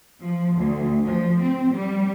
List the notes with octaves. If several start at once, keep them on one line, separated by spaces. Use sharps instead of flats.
F3
D2
F3
C4
G3